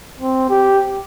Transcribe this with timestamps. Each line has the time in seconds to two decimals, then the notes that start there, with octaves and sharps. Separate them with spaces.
0.20 C4
0.50 G4